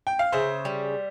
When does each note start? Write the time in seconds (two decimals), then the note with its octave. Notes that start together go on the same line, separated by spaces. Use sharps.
0.07 G5
0.19 F5
0.32 C#3 C5 E5
0.65 G3